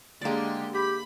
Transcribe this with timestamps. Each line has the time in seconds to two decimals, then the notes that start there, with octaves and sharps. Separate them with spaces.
0.22 D3 G#3 A#3 G4 D5
0.73 G4 B5